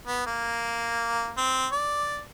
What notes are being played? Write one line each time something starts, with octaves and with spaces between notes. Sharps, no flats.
B3
A#3
C4
D5